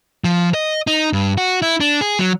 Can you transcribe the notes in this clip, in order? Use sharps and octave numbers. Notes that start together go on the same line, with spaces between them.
F3
D#5
D#4
G2
F#4
E4
D4
G#4
F#3